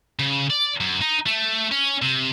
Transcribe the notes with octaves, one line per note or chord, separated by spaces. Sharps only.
C#3
D5
F#2
D#4
A3
C#4
C3